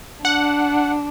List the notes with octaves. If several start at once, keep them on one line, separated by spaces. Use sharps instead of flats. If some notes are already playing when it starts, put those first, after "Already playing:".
D4 F#5